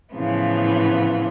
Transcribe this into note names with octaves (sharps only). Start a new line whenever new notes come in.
A2 C#3 E3 F3 B3